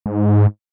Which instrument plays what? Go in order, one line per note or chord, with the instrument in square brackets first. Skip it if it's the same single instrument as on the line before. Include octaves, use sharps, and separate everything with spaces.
[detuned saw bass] G#2